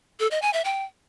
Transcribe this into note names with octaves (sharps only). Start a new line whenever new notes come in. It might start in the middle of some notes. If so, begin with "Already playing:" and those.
A4
D#5
G#5
E5
G5